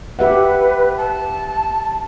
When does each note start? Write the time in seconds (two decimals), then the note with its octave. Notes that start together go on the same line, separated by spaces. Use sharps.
0.19 G4 B4 E5 F#5
0.97 A5